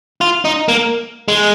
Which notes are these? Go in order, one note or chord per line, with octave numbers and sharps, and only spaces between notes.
F4
D#4
A#3
G#3